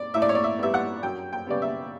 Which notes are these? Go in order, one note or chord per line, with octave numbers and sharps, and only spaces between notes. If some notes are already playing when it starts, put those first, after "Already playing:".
Already playing: D5
A2 E5
D5
C#5
D5
E5
G3 B3 E5
F#5
F#2 G5
G5
C#3 G3 B3 D5
E5